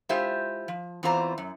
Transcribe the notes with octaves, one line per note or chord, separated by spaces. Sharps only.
G#3 E4 F4 G4 C5 E5
F3
E2 E3 C4 F4 C5 A#5
F#2